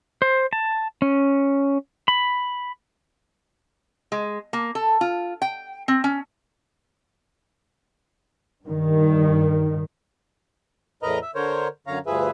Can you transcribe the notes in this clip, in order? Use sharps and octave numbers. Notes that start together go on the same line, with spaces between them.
C5
A5
C#4
B5
G#3
A#3
A4
F4
G5
C4
C#4
G2 D#3
E2 A2 A#4 B4 D#5 A#5
E5
D3 A#4 C5 C#5
F#2 D3 C#5 F5 A#5
D2 G2 F3 G#4 B4 E5